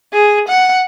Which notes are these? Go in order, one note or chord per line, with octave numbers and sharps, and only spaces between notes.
G#4
F#5